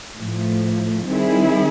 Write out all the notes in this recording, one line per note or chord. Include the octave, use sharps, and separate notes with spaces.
A2 F3 A3
D#3 G3 C4 E4 G#4